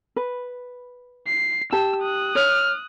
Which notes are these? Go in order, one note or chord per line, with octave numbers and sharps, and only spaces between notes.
B4
C7
G4 A5 E6
D#6 F#6
C#5 F6